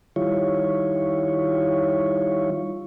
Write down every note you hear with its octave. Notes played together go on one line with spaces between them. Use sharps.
D#3 G3 E4 F4 C#5